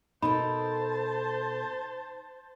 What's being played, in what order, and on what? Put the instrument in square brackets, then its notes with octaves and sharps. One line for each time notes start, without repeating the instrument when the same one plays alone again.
[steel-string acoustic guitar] B2 A4 A#4 [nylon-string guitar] D#4 [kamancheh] C5 A5 [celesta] B5